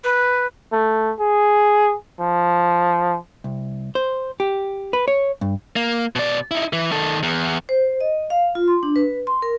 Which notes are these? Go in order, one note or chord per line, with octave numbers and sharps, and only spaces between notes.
B4
A3
G#4
F3
C2
C5
G4
B4
C#5
G2
A#3
B2 D5
D#4 E4
E3
D#3 A4
E2
C5
D#5
F5
F4
C6
D4
B4
C6
A#4